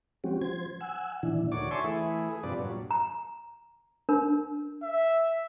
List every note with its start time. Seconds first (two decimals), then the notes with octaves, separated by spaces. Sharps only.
0.24 F3 G#3 C4 C#4 F#4 G4
0.41 F3 C5 G#6
0.81 F#5 G#5 E6
1.23 A#2 D#3 E3 D4 E4
1.52 D2 D#3 F#4 C#5 D5 D6
1.71 C#5 E5 G#5 A5 C6 C#6
1.84 E3 A3 E4 G#4
2.31 G#4
2.43 G2 C3 F3 B4 D5
2.58 G2 A#2 F#3
2.91 A#5
4.09 D4 A#4
4.83 E5